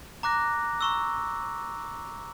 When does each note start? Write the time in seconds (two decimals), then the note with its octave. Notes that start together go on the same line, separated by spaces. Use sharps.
0.23 A#5 D6 F#6 A#6
0.81 A#5 C#6 E6